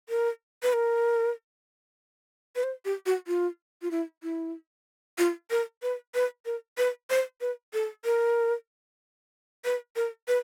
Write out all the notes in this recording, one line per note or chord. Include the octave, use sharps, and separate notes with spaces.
A#4
B4
A#4
B4
C5
G4
F#4
F4
F4
E4
E4
F4
A#4
B4
B4
A#4
B4
C5
B4
A4
A#4
B4
A#4
B4